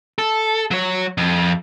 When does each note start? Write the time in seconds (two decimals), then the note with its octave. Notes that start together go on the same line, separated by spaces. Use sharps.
0.19 A4
0.71 F#3 C#5
1.18 F2